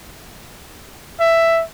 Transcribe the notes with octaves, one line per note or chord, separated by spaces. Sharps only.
E5